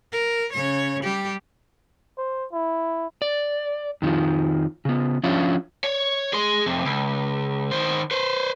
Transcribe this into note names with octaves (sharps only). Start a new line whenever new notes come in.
A#4
C#3 C#5
G3 G4
C5
E4
D5
F2 D#3 F3
C#3 B3
F3 C#4 D4 F4 C#5 E5
C#5
G#4 C6
F2 C3
C#2
D#3 C5
B4 C5